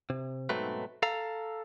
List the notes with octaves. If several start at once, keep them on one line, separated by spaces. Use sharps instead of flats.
C3
B1 G#2 F#3 A3 C4 B4
A4 F5 A#5